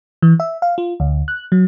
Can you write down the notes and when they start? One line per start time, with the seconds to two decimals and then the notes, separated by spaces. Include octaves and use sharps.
0.22 E3
0.40 E5
0.62 F5
0.78 F4
1.00 D2
1.28 F#6
1.52 F#3